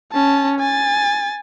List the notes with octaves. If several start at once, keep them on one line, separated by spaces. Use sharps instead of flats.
C#4 A5
G#5 A6